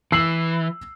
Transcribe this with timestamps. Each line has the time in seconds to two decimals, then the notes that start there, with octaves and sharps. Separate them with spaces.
0.12 E3 E6 C7 F#7